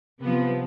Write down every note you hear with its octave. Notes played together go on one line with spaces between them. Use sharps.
C3 F3 B3